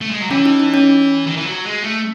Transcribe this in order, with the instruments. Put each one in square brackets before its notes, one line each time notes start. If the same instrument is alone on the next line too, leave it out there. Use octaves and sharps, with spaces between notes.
[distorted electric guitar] A3
G#3
F#3
[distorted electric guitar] E3 [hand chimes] C#4
[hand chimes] D#4
D#4
C#4
[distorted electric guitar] D#3
E3
F#3
G#3
A3